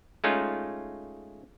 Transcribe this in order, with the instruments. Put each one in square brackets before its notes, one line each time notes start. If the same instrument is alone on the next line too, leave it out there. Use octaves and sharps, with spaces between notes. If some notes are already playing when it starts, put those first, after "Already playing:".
[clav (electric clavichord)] G#3 A3 C#4 D#4 F4